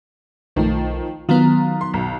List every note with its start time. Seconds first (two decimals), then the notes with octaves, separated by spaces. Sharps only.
0.56 B1 D#3 F3 A3
1.29 D#3 F#3 B3 F4 A#5
1.81 C6
1.94 B1